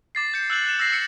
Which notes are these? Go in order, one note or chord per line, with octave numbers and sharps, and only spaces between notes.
D6 A6 C7
G6 C#7
E6 F#6 G6 F#7
F#6 E7
E6 A#6 C7
E6 C#7